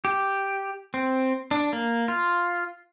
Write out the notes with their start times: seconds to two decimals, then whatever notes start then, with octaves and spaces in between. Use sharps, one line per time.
0.05 G4
0.94 C4
1.51 D4
1.73 A#3
2.08 F4